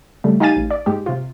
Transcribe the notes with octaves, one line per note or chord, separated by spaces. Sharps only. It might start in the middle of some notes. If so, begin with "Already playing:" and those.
C#3 G3 A3
D#4 G4 F5 G#5 A6 D#7
A1
D5
G#2 G#3 G4
C3 F4